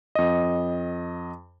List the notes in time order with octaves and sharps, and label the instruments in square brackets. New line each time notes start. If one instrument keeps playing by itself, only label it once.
[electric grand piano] F2 D#5